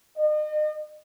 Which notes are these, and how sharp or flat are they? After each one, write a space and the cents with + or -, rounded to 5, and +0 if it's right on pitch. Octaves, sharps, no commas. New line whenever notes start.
D#5 -40